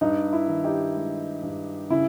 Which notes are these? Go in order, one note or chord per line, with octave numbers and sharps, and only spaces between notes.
G2 D#4
E4
D#3
D#4 G4
G#3
G2
C#3 E4